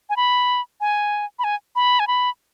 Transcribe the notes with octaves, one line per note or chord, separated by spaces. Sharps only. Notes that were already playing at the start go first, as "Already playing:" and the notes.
G#5
B5
G#5
B5
G#5
B5
G#5
B5